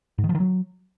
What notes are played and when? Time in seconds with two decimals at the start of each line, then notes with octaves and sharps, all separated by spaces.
0.18 G#2
0.24 D#3
0.29 F3
0.35 D#3
0.40 F#3